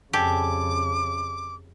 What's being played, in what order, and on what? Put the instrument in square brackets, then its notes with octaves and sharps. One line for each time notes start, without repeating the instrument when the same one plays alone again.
[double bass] F2 C#3 [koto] G4 [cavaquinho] A4 D5 G#5 [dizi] D6